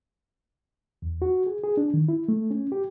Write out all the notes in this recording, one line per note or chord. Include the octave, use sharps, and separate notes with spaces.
E2
F#4
G#4
G#4
D4
D#3
E4
A3
C#4
G4